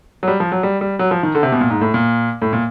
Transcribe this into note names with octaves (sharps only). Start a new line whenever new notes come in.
F#3
G3
F3
F#3
G3
G3
F#3
F3
D#3
D3
C3
B2
A#2
G#2
A2
A#2
A2
A#2